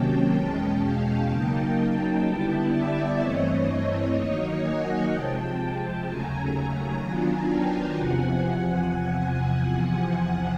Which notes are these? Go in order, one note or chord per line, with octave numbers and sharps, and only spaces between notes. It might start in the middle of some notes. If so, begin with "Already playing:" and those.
Already playing: C3 D#3 F#3 A#3 C#4 G5 A5
E2 B2 G#3 C#4
F5 G5
C#3 F#3 A#3 D#4 G5 A5
D3 G3 B3 E4
D5 E5
G2 E3 A3 C4 C#5 D#5
D#3 F#3 A#3 D#4
F#5 G#5
C3 F3 G#3 G5 A5
D#2 C#3 F#3 A3 G#5 A#5
D#3 F#3 B3 D4 F4 G#5 A#5
G5 A5
E2 C3 F3 F#5 G#5